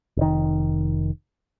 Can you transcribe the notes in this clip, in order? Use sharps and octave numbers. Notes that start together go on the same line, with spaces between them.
F1 D#3